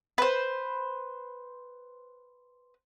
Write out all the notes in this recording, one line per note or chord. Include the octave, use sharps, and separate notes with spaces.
B4 C5